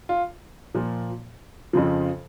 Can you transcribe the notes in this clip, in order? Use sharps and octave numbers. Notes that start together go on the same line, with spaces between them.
F4
A#2 F3
F2 C#3 F3